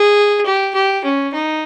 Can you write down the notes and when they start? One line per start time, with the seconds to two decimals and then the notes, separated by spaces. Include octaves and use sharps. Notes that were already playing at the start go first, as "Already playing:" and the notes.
Already playing: G#4
0.46 G4
0.75 G4
1.04 C#4
1.34 D#4